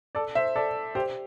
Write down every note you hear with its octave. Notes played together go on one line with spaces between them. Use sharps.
A4 D5
C5 E5
A4 D5
G4 C5